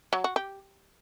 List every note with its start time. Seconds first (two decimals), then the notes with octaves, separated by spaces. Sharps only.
0.13 F#3
0.24 F#4
0.36 G4